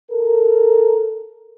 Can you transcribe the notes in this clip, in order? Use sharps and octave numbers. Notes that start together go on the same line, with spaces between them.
A4 A#4